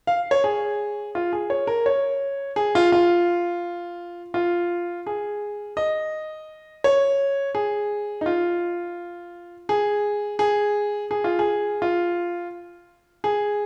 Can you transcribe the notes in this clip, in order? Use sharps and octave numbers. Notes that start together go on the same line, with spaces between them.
F5
C#5
G#4
F4
G#4
C#5
A#4
C#5
G#4
F4
F4
F4
G#4
D#5
C#5
G#4
D#4
F4
G#4
G#4
G#4
F4
G#4
F4
G#4